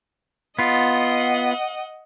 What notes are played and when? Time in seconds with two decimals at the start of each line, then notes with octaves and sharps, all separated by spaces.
0.59 B3 F4 D#5 F#5